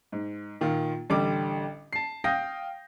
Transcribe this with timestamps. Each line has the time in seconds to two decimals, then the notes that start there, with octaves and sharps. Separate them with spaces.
0.12 G#2
0.61 A#2 D#3 F4
1.10 A1 D3 G3 D6
1.93 A5 C7
2.24 F5 G5 D#6 G6 A#6